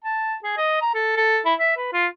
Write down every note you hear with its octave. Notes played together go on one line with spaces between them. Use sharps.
A5
G#4
D#5
A#5
A4
A4
E4
E5
B4
F4